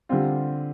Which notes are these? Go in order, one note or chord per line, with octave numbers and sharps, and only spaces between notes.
D3 G3 C4 F4